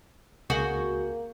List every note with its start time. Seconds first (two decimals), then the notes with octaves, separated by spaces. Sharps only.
0.50 C#2 A#3 F#4 G#4 G6